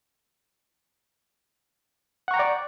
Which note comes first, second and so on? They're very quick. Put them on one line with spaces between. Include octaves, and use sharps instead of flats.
F#5 C#6 A#5 G5 D5